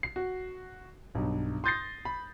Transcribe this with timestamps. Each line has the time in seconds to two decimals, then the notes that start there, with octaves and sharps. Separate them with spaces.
0.03 C7
0.16 F#4
1.15 B1 G2
1.64 C6 D#6 G6 A6 A#6 C7
2.05 B5